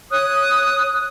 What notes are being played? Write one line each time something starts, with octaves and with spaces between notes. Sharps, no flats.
C#5 D#6 F#6